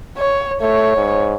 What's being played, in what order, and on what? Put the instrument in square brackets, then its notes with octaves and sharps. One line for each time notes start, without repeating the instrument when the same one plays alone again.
[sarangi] C#5
[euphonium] A3 [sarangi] C#5
[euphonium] G#2